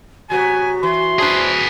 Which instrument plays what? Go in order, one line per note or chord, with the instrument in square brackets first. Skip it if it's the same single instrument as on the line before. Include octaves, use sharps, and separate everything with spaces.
[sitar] C3 F#3 B3 [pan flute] F#4 [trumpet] G#5
[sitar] E3 [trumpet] C6
[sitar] C#4 D4 C5 [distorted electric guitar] G#4 B4